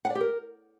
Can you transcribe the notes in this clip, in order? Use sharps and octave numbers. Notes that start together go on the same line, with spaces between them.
F#5
D5
G4
A#4